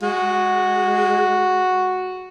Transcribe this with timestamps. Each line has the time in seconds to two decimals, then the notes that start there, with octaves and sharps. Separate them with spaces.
0.02 G#3 F#4